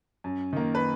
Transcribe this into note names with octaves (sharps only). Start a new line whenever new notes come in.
F#2
D#3 A#3
B4